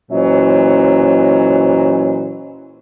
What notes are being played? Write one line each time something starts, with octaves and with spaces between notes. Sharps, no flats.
A#2 E3 F#3 C#4 C5 D#5